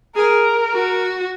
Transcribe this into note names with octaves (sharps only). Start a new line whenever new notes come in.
G#4 A#4
F#4